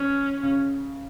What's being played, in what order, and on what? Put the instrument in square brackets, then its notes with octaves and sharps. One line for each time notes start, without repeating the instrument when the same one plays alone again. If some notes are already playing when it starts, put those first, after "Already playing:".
Already playing: [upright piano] E3 [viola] C#4
[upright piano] C#3